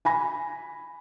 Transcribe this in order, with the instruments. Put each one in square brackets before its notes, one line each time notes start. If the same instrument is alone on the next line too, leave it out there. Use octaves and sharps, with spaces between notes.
[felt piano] G#5 B5 A#6